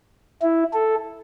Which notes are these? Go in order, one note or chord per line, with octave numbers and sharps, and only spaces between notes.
E4
A4